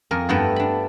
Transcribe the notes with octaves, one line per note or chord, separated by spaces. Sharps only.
F2 A#4 G#5
G2 A3 B3 E4 G5 A#5
D4 B5